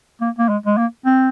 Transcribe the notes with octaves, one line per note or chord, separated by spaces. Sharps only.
A#3
A#3
G#3
G#3
A#3
C4